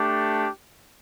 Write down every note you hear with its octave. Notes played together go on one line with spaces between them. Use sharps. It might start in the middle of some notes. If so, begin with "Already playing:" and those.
Already playing: A3 D4 G4